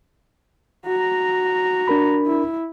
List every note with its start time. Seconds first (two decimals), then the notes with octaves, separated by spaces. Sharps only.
0.86 F#4 A#5
1.88 D4 A#4 B5
2.27 E4